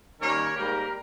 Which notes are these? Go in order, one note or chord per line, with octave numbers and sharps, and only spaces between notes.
D#3 G3 A#3 C#4 A#4 C#5
G#2 G3 A#3 G4 A#4